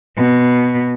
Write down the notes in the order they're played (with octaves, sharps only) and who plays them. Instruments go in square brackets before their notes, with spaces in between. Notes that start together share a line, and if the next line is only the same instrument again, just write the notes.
[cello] B2